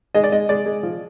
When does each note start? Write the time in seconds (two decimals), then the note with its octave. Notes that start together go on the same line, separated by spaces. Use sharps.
0.15 G#3 D#5
0.24 D5
0.32 G#3 D#5
0.49 G#3 D5
0.66 G#3
0.83 F3